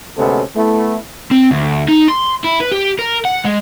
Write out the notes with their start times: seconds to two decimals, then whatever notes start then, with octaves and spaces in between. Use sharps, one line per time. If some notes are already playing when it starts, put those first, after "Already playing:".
0.17 D2 C3 G#3 B3 C#4 A4
0.54 A3 B3 E4
1.31 C4
1.51 D2
1.89 D#4
2.08 C6
2.44 E4
2.60 B4
2.72 G4
2.99 A#4
3.25 F#5
3.45 G#3